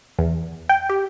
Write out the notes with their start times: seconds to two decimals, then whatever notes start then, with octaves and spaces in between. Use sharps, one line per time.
0.18 E2
0.69 G5
0.89 G4